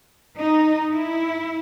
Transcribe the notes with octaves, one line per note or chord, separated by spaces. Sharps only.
D#4
E4